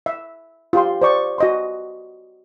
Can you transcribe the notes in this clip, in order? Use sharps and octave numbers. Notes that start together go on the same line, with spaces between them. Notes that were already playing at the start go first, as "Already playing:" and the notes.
E5
F4 G4 C6
C5 D5 C#6
F#4 D#5 C6